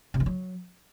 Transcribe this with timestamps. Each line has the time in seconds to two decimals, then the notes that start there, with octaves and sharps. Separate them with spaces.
0.14 C3
0.20 E3
0.26 F#3